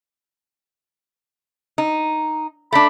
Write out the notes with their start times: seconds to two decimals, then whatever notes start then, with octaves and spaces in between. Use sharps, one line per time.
1.78 D#4
2.73 A3 D4 B5